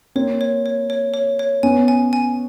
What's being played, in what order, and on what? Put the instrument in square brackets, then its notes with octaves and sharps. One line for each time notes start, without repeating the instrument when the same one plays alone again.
[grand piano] A#3 C4 [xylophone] C#5
[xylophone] C#5
C#5
C#5
C#5
C#5
[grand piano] B3 C#4 [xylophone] G#5
[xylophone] G#5
G#5